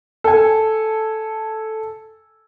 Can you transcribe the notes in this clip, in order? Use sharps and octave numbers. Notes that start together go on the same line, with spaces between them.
A4 G#5